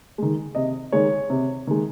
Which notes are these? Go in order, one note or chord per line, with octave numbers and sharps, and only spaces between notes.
D#3 G#3
C3 D#5
D#3 G#3 C#5
C3
D#3 G#3